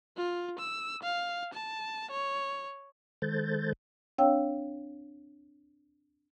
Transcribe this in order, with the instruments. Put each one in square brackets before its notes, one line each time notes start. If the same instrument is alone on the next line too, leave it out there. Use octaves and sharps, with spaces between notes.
[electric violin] F4
E6
F5
A5
C#5
[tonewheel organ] D#3 G#3 A4 C5 G6 A6
[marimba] C4 D4 C#5 F5 G5 E6